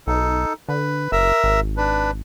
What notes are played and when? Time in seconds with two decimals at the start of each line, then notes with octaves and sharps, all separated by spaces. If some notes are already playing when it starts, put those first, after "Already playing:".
0.07 B1 D#4 A4
0.69 D3 B4
1.12 F#1 A#4 E5 E6
1.44 G#1
1.77 D4 B4